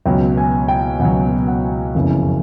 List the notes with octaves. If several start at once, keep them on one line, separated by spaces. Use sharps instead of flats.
C#2 B2 F#3 G5
G#5
G5
C#2 B2 F#3 F#5
F#5
F#1 F2 C#3 E3